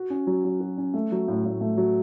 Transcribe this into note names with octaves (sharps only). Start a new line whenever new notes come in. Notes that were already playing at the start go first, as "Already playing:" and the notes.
Already playing: F#4
C#4
F#3
F#3
F#4
C#4
A3
F#3
A2
A2
A3
F#3